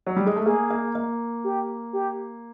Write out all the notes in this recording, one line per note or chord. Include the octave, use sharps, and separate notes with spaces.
F#3
G3
G#3
A3
A#3 G#4
A#3
A#3
G4
G4